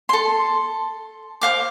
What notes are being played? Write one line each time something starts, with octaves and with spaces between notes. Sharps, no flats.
A4 C6
C5 F5 D6